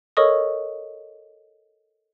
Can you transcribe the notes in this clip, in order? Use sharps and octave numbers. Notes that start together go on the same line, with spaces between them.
A4 A#4 C#5 D#5 C#6 D#6